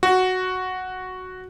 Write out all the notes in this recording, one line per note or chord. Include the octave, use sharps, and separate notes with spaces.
F#4